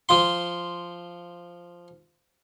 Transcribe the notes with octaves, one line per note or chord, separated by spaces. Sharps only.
F3 F4 C6